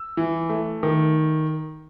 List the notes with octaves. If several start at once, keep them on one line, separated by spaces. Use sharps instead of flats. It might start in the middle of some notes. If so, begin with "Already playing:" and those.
Already playing: E6
E3
A3
D#3